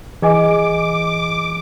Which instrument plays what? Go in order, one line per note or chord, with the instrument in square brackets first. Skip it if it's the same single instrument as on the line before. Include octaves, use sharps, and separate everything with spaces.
[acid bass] E3 [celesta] G#4 D#5 G#5 [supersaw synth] D6